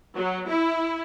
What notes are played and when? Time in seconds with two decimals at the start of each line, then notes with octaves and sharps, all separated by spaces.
0.15 F#3
0.49 E4